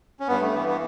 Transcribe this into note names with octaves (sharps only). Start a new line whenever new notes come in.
C#4
G2 B3
A3
E3 B3
B3